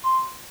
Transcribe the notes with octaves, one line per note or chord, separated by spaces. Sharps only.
C6